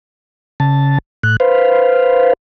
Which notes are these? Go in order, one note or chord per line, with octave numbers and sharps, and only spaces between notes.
C#3 A5
A2 F#6
B4 C5 F5